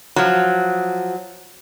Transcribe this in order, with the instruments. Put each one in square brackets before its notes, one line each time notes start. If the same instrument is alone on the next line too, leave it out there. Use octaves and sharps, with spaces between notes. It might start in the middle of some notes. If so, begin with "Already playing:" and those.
[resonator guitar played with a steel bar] F3 F#3